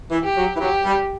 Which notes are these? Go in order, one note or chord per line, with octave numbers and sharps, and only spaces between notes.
E3
G4
F#3
E3
F#3 G4
G3